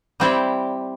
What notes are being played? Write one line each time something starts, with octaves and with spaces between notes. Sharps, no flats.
G3 C4 E4 G4 D5